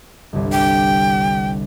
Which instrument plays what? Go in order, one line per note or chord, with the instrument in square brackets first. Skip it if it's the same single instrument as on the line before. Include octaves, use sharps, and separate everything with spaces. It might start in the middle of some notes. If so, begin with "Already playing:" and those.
[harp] G1 C2
[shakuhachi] G5